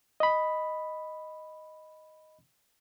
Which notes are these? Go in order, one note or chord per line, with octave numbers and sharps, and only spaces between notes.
D#5 B5